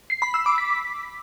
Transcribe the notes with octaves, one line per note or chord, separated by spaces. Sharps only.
C7
B5
E6
D6
B6